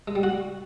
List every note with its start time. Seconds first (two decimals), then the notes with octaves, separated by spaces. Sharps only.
0.08 G#3
0.15 G3
0.23 F#4